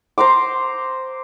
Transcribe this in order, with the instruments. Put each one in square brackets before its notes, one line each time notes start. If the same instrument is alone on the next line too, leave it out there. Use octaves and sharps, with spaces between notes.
[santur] C5 A#5 C6 D6